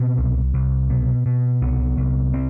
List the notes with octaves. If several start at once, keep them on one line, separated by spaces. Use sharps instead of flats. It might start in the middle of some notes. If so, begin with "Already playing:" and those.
Already playing: B2 C4
C2
C2
B2
B2
C2 B3
C2
C4